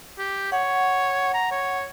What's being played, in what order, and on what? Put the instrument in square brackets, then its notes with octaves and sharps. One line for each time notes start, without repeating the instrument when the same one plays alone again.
[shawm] G4
[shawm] C#5 [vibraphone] F#5
[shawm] A#5
C#5